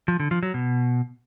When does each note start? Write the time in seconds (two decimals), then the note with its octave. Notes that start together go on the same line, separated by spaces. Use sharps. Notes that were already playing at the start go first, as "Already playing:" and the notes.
0.08 F3
0.20 D3
0.31 F3
0.43 F#3
0.54 B2